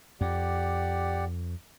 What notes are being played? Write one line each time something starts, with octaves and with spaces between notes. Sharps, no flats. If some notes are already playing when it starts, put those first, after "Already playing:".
F2 G4 D5 F#5